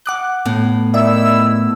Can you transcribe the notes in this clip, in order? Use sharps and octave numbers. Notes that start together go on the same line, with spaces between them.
F#5 D6 F#6
A2 B3
D#3 E4 D5 E5 E6